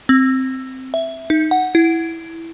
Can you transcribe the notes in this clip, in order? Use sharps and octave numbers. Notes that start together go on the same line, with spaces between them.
C4
E5
D#4
F#5
E4